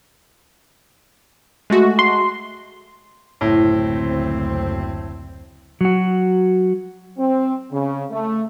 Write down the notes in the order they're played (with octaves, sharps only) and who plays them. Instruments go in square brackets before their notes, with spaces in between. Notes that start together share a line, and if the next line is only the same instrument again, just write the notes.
[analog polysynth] G#3 A3 F#4
[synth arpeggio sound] C6
[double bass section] F#1 D2 C4 [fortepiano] A2
[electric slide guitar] F#3 F#4
[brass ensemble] C4
C#3
A3